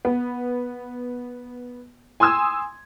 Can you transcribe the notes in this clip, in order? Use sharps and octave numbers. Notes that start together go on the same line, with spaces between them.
B3
G#5 C6 D#6 E6 G#6